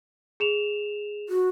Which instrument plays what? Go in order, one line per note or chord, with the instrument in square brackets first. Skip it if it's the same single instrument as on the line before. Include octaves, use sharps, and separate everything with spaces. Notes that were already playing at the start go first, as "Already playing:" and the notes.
[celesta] G#4 E7 F7
[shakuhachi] F#4